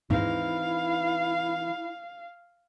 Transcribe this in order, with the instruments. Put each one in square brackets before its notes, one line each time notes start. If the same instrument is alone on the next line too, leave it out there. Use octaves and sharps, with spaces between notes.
[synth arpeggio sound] D#2 G#2 [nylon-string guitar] E3 C4 D#4 [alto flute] E4 [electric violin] F5